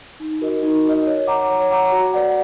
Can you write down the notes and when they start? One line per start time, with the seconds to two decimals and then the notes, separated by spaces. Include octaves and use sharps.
0.20 D#4
0.41 F#4 A#4 D#5
0.63 D#4
0.85 F#4 A#4 D#5
1.06 C#5
1.27 F#5 A#5 D6
1.50 C#5
1.71 F#5 A#5 D6
1.92 F#4
2.14 B4 D5 F#5